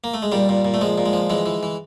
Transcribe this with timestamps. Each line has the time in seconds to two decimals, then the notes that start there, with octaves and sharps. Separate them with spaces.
0.04 A#3
0.14 A3
0.22 G#3
0.32 A#2 G3
0.49 A#2
0.65 A#2
0.74 A3
0.81 F3 G#3
0.98 A#2
1.06 G#3
1.13 F3
1.30 E3 G#3
1.46 E3
1.63 E3